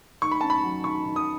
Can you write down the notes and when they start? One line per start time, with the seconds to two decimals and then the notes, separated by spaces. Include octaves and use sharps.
0.22 D#3 C#6
0.31 B5
0.41 C#4 A5
0.50 B5
0.64 F#3
0.84 D#3 C#6
1.05 D#3
1.16 D#6